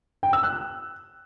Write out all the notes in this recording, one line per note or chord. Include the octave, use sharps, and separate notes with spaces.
G5
E6
F#6